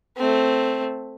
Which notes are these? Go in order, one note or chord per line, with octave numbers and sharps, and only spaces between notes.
A3 C4